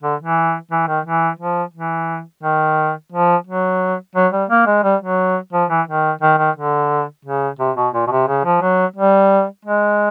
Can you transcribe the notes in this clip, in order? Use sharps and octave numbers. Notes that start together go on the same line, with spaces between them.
D3
E3
E3
D#3
E3
F3
E3
D#3
F3
F#3
F#3
G3
A#3
G#3
G3
F#3
F3
E3
D#3
D#3
D#3
D3
C#3
C3
B2
A#2
B2
C3
C#3
F3
F#3
G3
G#3